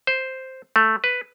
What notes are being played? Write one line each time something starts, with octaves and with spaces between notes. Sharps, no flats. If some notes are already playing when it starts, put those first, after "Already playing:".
C5
A3
B4